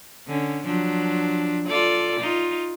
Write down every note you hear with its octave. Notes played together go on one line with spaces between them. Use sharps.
D3 C#4
F3 F#3 D4
F4 A4 D5
D#4 F4